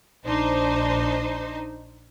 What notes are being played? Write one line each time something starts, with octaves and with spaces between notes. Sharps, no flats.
A#1 D4 D#4 C5